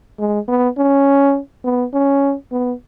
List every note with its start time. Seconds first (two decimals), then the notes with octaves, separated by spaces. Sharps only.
0.19 G#3
0.48 B3
0.78 C#4
1.64 B3
1.93 C#4
2.52 B3